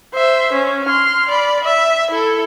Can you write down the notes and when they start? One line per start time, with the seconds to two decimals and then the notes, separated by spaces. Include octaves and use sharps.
0.13 C5 E5
0.53 C#4
0.85 C6 F6
1.29 D5 B5
1.64 E5
2.10 E4 A4